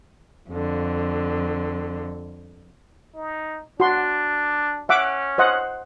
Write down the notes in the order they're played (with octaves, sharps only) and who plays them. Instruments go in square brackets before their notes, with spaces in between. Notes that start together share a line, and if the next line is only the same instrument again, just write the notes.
[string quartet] F2 D3
[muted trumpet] D#4
[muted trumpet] D4 [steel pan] F#4 C6
[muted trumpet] C#4 [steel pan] E5 F#5 D6
[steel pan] C5 D#5 F#5